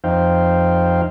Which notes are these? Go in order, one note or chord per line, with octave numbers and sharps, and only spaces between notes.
F2 D#4 C5 F5 G5